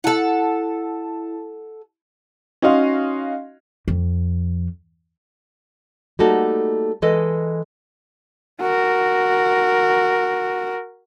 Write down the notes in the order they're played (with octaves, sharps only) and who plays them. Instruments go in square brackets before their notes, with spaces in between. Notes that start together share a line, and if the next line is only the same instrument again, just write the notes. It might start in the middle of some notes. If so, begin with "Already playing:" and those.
[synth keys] E4 A5 [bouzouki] A4 F#5
[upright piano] C#4 D#4 F#4 D#5 F5 C6
[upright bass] F2
[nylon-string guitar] G3 A3 A#3 D#4 F#4 A4
E3 G#3 A4 D#5
[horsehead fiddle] F#4 A#4